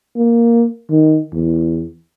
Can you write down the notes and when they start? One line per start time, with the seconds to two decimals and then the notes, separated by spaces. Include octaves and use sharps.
0.16 A#3
0.90 D#3
1.33 E2